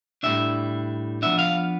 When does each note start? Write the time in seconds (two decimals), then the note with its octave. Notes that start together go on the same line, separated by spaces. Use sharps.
0.23 A2 G3 D4 E5
1.22 F3 B3 D4 E5
1.39 F5